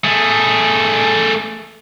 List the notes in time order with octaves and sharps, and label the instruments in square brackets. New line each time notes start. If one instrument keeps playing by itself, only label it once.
[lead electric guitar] A3 G#4